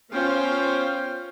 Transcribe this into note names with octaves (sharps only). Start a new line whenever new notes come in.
B3 C#4 F4 C5 F5 G5